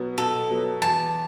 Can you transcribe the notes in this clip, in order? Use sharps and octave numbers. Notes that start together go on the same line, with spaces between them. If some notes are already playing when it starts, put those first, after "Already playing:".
Already playing: B2 F#3 B3
B2 A4
F#3 B3
E2 A5